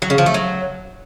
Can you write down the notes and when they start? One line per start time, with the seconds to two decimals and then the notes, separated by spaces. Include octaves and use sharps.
0.02 F#3
0.10 C#3
0.18 F3
0.26 A3
0.34 F#3